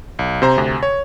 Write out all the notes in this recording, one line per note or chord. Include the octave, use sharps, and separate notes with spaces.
B1
C3 C5 A#5
D2 C3
C#5